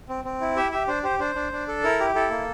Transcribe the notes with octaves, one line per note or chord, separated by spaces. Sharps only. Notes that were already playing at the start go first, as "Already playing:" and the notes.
C4
C4
E4
G4 E5
G4 E5
D4 C5
G4 C5
D4 C5
D4
D4
A4
E4 A#4
G4
E4 A4
A#3